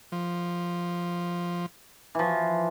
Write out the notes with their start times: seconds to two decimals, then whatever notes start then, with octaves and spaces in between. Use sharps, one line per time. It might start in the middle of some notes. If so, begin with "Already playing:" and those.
0.12 F3
2.15 E3 F3